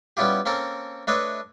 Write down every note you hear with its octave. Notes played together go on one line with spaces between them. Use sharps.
G3 B3 C#4 E4 F4 G4
A#3 C4 C#4 A4 A#4
A3 D4 B4 C#5 D#5 E5